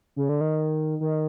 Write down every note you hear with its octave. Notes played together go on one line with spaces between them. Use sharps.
C#3
D3
D#3
D#3